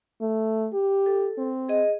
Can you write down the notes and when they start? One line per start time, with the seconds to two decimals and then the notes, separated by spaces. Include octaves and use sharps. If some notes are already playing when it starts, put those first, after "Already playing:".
0.21 A3
0.73 G4
1.06 A4
1.37 C4
1.69 G#4 D#5